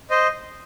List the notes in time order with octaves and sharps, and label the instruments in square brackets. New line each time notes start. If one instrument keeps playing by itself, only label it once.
[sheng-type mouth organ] C5 D#5